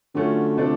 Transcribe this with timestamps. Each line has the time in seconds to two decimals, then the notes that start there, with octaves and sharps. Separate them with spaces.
0.15 D3 F#3 A3 C#4 F4
0.57 C3 F3 A3 D4